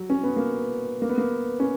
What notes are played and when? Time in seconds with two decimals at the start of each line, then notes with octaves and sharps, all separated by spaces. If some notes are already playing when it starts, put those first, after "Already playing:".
Already playing: F#3
0.10 C#4
0.24 B3
0.37 A#3
1.02 A#3
1.09 B3
1.18 A#3
1.60 C#4